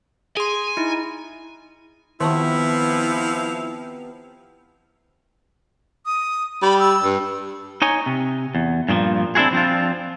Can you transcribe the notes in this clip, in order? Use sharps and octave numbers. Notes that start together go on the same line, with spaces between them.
G#4 G#5 C6
D#4 E4
C3 D#3 F3 B3 E4 A5 C#6
D#6
G3 B5
E6
G2
D#4 C#5 G#5
C3
E2
G2 A#2 D#3 F3
C4 D4 E4 F#4 G#4
F3 C4 D4 F4